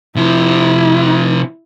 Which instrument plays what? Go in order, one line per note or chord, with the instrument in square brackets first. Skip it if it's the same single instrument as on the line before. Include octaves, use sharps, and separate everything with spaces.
[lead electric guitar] C3 F3 [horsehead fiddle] E4